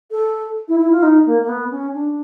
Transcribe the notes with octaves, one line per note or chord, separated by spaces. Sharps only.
A4
E4
E4
F4
D#4
A#3
A#3
B3
C#4
D4